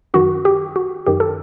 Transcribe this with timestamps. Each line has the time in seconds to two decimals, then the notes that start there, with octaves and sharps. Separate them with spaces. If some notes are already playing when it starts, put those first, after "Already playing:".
0.14 F#2 D#3 F#4
0.45 G4
0.76 F#4
1.07 F#2 D#3 G4
1.20 A4